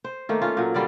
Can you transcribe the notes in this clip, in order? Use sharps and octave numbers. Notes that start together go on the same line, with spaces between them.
C5
D#3 A3 A#3
C#4 F4
A#2 F#3
D3 G3 F4 D5